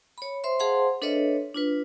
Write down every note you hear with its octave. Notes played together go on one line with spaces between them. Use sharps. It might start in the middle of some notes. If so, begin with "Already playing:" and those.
C#5 B5
C5 E5 C6
G#4 C5 F5 F#5 A5 C6
D4 A4 B4 C#5 D#5 E5
D4 F4 B4